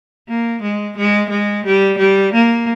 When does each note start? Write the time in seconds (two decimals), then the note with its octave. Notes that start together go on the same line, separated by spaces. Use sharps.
0.28 A#3
0.62 G#3
0.97 G#3
1.30 G#3
1.65 G3
1.98 G3
2.33 A#3